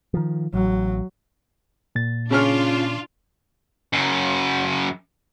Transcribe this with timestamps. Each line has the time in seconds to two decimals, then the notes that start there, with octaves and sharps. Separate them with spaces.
0.14 D#3 F3
0.54 A1 F#3
1.95 A#2 A6
2.31 C#3 C#4 D4 F4 F6
3.93 F#2 C#3